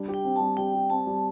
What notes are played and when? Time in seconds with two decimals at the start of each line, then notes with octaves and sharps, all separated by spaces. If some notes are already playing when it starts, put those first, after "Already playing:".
Already playing: G3 D4
0.09 G4
0.14 G5
0.25 C4
0.36 G3 A5
0.57 G3 G5
0.74 G4
0.90 C4 A5
1.07 G3